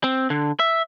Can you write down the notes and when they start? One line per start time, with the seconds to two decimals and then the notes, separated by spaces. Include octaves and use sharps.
0.04 C4
0.30 D3
0.59 E5